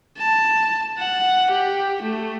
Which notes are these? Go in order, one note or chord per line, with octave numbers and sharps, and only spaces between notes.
A5
F#5
G4
A3